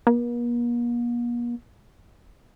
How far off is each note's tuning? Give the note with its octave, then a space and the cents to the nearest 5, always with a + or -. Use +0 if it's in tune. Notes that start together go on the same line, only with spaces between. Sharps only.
A#3 +45